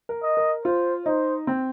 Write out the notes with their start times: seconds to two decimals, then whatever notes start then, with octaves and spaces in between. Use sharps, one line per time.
0.09 A#4
0.23 D#5
0.37 A#4
0.65 F4 C5
1.06 D#4 C5
1.47 C4